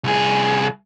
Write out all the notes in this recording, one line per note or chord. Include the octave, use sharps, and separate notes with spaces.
C2 G#4